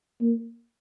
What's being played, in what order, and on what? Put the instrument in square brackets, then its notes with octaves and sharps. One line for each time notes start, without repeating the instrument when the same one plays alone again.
[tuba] A#3